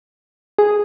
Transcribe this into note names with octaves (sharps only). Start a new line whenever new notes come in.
G#4